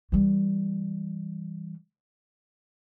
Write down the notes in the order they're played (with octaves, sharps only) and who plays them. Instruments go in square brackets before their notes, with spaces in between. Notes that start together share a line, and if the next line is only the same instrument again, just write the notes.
[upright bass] E3 G3